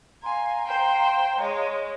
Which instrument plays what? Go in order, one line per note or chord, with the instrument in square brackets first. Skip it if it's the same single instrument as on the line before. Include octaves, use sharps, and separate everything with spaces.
[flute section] F5 A#5 C6 [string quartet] G#5
[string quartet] C5 G5
G#3 C#5